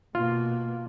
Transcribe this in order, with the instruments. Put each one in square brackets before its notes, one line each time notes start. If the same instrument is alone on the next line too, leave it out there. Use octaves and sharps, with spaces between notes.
[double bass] B2 A#3 [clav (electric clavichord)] F4